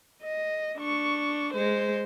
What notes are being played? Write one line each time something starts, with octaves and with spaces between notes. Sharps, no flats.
D#5
D4 C#6
G#3 C5